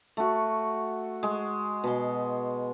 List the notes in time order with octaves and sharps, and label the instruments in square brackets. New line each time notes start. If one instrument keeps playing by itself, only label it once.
[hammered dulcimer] A3 F#4
G#3
B2 C6